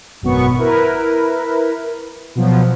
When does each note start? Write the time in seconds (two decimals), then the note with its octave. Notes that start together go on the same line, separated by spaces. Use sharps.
0.21 G#1 F#2 B2 B3 C#6
0.58 E4 A#4 B4
2.35 B2 F3 F#3